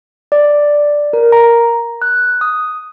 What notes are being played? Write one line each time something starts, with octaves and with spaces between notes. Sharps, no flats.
D5
A#4
A#5
F#6
D#6